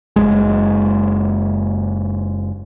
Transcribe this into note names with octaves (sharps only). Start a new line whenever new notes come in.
F#1 E2 G#3